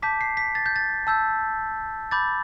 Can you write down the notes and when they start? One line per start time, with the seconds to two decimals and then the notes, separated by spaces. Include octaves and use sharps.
0.02 A5 D6 G6 B6
0.21 C7
0.37 B6
0.55 A6
0.66 G6
0.76 A6
1.07 A5 E6 G6
2.11 B5 D6 G6 A6